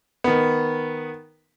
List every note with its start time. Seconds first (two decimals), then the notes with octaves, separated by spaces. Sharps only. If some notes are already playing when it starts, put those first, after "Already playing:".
0.24 D#3 B3